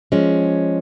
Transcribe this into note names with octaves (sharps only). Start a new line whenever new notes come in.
F3 G#3 C#4